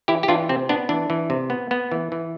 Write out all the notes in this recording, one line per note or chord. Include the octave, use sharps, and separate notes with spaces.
E3 E4 G4
G4
E3 D4 F4
C3 C4
B3 D4
E3 D4
E3
C3
B3
B3
E3
E3